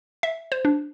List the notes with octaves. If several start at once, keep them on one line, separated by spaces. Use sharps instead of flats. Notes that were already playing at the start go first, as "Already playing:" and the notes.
E5
C5
D4